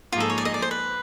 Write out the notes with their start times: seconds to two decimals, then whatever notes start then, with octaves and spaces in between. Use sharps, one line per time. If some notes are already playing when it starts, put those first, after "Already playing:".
0.12 G#2 F3 A#3 D#4 F4 G#4
0.20 A4
0.30 C#5
0.38 D5
0.45 D#5
0.54 D5
0.62 C5
0.71 B4